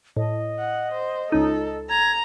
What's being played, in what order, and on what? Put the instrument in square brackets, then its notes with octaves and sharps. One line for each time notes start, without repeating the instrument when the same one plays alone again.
[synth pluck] A2 [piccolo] D#5
[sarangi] F#5
C5
[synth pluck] C#2 D#4 [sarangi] A4
[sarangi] A#5 [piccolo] G#6